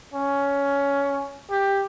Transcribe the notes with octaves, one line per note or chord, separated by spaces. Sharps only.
C#4
G4